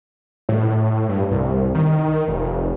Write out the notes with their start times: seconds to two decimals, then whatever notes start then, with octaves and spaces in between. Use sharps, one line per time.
0.49 A2
1.09 G2
1.31 C2
1.75 D#3
2.28 F1